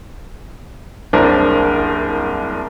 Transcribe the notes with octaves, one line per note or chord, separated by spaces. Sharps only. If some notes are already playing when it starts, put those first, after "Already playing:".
F#1 C2 D4 A#4 C5